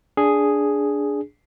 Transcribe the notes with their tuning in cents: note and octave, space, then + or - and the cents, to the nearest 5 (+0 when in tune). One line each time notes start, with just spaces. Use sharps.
D4 -10 G#4 +0